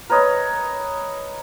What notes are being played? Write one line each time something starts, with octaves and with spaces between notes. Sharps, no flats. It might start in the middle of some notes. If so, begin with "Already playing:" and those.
A#4 B4 C#5 D#5